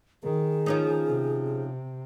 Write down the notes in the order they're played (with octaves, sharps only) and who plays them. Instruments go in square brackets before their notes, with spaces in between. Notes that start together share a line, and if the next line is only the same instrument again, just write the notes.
[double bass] D#3 [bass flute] G#4
[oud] F3 C#4 D#4
[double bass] C3